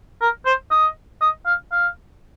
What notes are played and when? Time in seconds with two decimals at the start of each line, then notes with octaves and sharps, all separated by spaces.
0.22 A#4
0.46 C5
0.71 D#5
1.21 D#5
1.46 F5
1.72 F5